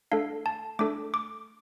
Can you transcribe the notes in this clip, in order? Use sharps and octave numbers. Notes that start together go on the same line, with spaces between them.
A3 D4 A4 F5
A5
A3 D4 A4 D6
D6